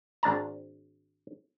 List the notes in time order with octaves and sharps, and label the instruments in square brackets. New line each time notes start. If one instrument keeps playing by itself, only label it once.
[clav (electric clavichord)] G#1 D4 A5 A#5